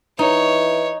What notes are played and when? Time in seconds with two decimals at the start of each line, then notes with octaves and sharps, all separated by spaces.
0.19 E3 D#4 C#5